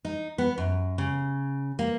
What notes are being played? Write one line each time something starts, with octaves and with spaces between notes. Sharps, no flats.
D#4
B3
F#2
C#3
A#3